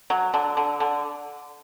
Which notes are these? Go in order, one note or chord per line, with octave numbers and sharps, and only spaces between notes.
F#3
D3
D3
D3